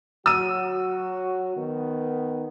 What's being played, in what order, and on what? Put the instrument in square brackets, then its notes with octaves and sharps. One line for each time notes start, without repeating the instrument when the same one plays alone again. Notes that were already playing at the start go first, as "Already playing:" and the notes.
[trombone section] F#3 F#4 [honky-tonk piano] E6 D#7
[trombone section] D#3 B3